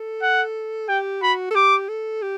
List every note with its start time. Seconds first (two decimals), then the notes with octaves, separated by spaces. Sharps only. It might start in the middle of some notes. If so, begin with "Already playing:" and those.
Already playing: A4
0.22 F#5
0.89 G4 G5
1.22 F#4 B5
1.51 A4
1.55 G4 D6
1.89 A4
2.22 G4